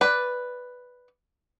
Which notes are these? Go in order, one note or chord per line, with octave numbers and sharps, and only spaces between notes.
B4 D5